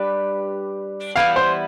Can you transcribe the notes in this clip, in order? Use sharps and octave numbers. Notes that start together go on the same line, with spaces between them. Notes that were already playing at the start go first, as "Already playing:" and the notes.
Already playing: G3 D4 G4 B4
E3 G3 B3 E4 F5
C5